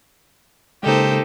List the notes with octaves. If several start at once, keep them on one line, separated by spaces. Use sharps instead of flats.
C#3 G#3 A#3 D#4 G4 A4 C5